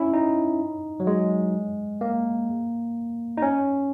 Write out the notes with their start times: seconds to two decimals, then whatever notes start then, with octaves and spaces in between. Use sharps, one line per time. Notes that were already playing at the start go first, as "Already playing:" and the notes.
Already playing: C#4 E4
0.13 D#4
1.00 F#3
1.07 G#3
2.01 A#3
3.37 D#4
3.42 C#4